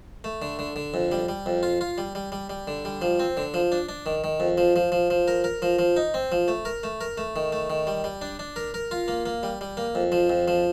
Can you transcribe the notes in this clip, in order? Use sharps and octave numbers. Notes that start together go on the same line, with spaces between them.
A3
D3
D3
D3
F2
G3
G3
F2
F4
F4
G3
G3
G3
G3
D3
G3
F3
C4
D3
F3
D4
D4
D#3
D#3
F2
F3
F3
F3
F3
A#4
A#4
F3
F3
D#4
C4
F3
A3
A#4
A3
A#4
A3
D#3
A3
D#3
G3
G3
D4
D4
A#4
A#4
F4
A#3
A#3
G3
G3
A#3
F2
F3
F2
F3